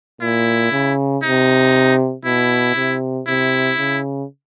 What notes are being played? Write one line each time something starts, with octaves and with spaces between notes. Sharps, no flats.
A#2 E4
C#3
C3 D#4
B2 E4
C3
C3 E4
C#3